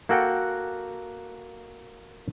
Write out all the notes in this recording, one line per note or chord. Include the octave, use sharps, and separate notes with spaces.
A#3 F#4 A4 F#5 G5